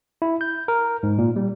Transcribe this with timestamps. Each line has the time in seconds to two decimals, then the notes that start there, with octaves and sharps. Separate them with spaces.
0.22 E4
0.41 G6
0.68 A#4
1.03 G#2
1.18 A#2
1.36 G3